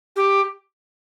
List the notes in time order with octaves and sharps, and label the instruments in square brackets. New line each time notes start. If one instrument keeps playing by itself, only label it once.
[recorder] G4